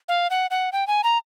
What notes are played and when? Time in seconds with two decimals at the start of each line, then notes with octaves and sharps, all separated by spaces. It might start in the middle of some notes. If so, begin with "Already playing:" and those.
0.08 F5
0.30 F#5
0.51 F#5
0.73 G5
0.87 G#5
1.04 A#5